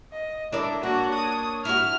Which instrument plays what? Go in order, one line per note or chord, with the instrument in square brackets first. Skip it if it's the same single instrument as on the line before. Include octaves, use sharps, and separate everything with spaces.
[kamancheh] D#5
[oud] D4 A#4 D5 [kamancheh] E4 A4
[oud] A#3 [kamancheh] D4 C#5 [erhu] F#4
[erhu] D#6
[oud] E4 F#4 [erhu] F6